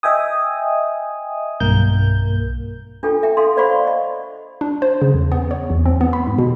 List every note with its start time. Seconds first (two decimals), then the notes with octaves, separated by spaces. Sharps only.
0.03 D#5 E5 G5 G#5 D#6
1.60 B1 G2 A#3 A#4 G6
3.03 D4 F4 A4 G5
3.23 E5 G5
3.37 A4 F5 C6
3.57 C5 D5 F5 F#5 B5 C#6
3.87 D#5
4.61 D4
4.82 C5
5.02 C#3
5.14 E2
5.32 B3
5.51 C#5
5.70 E2
5.86 C4
6.01 B3
6.13 B5
6.27 G#2
6.38 B2